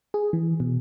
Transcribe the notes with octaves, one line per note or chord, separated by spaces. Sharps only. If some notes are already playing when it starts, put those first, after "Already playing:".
G#4
E3
B2